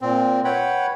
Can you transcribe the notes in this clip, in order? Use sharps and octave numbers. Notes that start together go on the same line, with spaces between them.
A#2 C4
B4 C#5 F#5 G5 B5